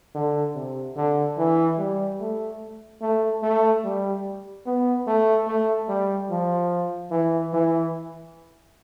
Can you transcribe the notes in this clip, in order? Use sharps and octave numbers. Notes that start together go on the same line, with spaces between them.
D3
C3
D3
E3
G3
A3
A3
A3
G3
B3
A3
A3
G3
F3
E3
E3